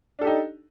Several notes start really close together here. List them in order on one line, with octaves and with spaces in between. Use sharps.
D4 A4 G4 D#4